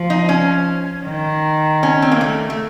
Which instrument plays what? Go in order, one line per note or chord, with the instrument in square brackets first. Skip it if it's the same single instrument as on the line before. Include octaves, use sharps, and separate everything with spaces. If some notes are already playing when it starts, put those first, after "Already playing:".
Already playing: [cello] F3
[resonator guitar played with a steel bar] D#4
C#4
[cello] D#3
[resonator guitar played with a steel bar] C#4
C4
A#3
A3
A3